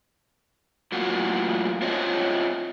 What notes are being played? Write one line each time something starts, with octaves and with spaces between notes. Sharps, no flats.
F#2 A2 A#3 F4 F#4
C4 F4 C#5 D#5 E5